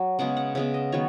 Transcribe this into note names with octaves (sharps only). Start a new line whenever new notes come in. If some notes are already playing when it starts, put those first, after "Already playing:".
Already playing: F#3
C#3 G#3 B3 F#5
F#5
C#3 G#3 B3 E5
D#5
D#3 F#3 B3 C#5